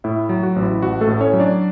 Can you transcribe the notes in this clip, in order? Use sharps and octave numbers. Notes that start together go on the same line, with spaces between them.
A2 E4 E5
F#3
F#4
A1
E4
A1 F#4
A3 A4
A2
C#4 C#5
F#3
D4 D5